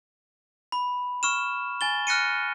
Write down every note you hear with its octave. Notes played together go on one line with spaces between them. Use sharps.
B5
C#6 F6 E7
G#5 A6 G7
F6 F#6 A#6 C#7 D#7